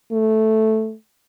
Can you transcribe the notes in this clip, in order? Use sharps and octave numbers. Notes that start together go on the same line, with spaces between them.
A3